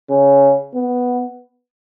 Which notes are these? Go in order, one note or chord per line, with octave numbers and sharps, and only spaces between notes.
C#3
B3